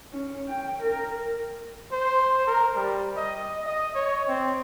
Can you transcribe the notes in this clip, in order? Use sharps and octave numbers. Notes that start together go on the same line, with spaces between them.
C#4
G5
A#4
C5
A#4
G3
D#5
D#5
C#5
C4